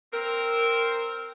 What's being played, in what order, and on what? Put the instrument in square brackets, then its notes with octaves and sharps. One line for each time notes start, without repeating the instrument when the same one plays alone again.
[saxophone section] C4 A#4